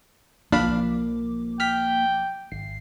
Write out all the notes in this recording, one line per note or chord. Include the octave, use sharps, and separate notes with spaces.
B1 F3 A#3 D4 F5 B5 D6
G5 F6 B6
G#1 C7